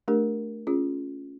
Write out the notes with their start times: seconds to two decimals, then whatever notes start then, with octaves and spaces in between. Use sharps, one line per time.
0.08 A3 D4 G4 A#4
0.67 C#4 F4 G#4